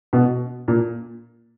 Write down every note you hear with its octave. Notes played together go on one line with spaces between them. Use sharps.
B2
A#2